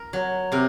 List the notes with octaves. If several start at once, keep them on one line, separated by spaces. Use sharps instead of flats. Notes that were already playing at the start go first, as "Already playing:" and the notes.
Already playing: A#4
F#3
C3 A#4